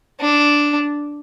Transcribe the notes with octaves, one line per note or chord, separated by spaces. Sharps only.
D4